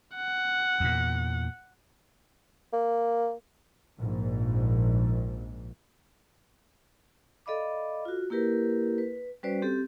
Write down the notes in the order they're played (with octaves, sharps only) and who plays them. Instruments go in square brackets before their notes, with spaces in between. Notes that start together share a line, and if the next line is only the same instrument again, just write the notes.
[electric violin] F#5
[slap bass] E2 A#2
[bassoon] A#3
[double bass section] A#1 G#2
[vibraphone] A4 D5 D#5 F5 B5 D6
F4 F#4
A#3 E4 G4 A#4 B4
B4
G3 C#4 F#4 B4 C5 D5
C4 G4 A4